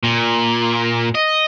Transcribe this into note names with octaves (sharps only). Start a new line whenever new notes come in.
A#2
D#5